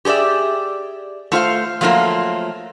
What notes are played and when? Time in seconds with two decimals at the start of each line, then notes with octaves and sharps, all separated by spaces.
0.05 G4 G#4 C#5 D5 E5
1.32 A3 F4 C5 F5
1.81 F3 F#3 A3 A#3 F4